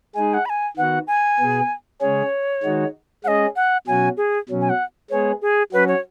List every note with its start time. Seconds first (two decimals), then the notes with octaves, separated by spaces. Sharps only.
0.15 G#3 D#4 G#4 G#5
0.34 F#5
0.46 B5
0.49 G#5
0.76 D#3 B3 F#4 F#5
1.07 G#5
1.40 B2 B3 G#4
2.00 C#3 G#3 C#4 G#4 C#5
2.63 D#3 G#3 D#4 F#4
3.24 G#3 C#4 G#4 D#5 F#5
3.56 F#5
3.87 B2 F#3 C#4 F#4 G#5
4.17 G#4
4.49 B2 F#3 C#4
4.61 G#5
4.70 F#5
5.10 G#3 B3 G#4 C#5
5.42 G#4
5.72 F#3 C#4 F#4 B4
5.88 C#5